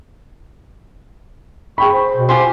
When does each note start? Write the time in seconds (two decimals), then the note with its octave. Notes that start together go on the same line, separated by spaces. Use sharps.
1.78 G#4 G5 B5 C#6
1.92 C5
2.15 B2
2.29 F4 G4 C5 G#5